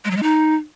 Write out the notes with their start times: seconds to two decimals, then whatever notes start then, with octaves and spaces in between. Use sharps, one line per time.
0.05 G#3
0.11 F#3
0.17 G#3
0.23 D#4